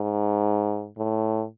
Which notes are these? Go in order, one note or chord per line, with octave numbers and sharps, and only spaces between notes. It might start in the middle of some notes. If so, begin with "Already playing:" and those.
Already playing: G#2
A2